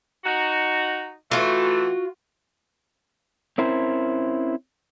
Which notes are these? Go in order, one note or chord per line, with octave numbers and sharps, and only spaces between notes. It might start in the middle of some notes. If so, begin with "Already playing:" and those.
D#4 F#4
E3 A3 F4 F#4
C4 C#4 E4 A#4 C5